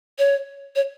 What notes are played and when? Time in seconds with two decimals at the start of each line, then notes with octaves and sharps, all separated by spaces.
0.19 C#5
0.76 C#5